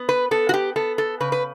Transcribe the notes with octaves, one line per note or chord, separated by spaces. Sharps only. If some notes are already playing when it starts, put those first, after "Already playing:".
Already playing: B3
B4
B3 A4
F#4
G4
B3 A4
A4
C#3 B4
B4